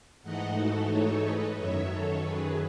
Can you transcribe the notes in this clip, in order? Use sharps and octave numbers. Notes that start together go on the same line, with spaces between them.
G#2 E3 A3 D#4 D#5 F#5
F#4 A4
A4 C#5
B4 D#5
F#2 D#3 F#3 C#5 E5
A4 C#5
G#4 B4